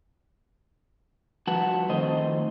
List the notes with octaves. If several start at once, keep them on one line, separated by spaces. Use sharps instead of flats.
G2 F3 F#4 B4 F#5 A5
F2 D#3 A3 C5 D#5